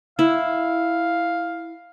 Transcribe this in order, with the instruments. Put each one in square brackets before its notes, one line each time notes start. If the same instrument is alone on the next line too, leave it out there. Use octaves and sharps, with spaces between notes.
[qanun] E4 [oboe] F5